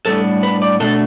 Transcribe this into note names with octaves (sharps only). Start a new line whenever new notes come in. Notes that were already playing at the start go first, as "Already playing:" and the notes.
A2 G3 B3 D4 A4
B4
D5
B2 A3 D4 A4